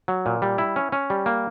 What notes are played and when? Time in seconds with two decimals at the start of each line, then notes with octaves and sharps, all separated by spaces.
0.08 F#3
0.26 A#2
0.42 G3
0.58 E4
0.76 C#4
0.92 C#4
1.10 G3
1.26 A#3